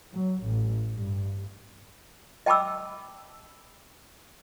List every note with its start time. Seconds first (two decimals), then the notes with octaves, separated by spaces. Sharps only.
0.12 F#3
0.43 A1
0.90 G2
2.46 D#5 G5 A5 B5 D6 E6